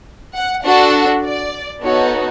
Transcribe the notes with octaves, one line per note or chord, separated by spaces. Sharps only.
F#5
D4 F#4 A4 F#5
D5
B3 D#4 F#4 A4 C#5